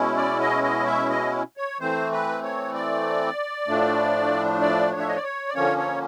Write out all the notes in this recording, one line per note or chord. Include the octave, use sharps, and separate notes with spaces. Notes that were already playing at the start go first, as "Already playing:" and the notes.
Already playing: B2 G#3 C#4 E4
D5
D#5
D#5
E5
D#5
C#5
E3 A3 C4 C5
B4
C#5
D5
A2 F3 A3 D4
D5
C#5
E5
D#5
D5
C#5
D5
D3 F3 A#3 C#4 C#5
C#5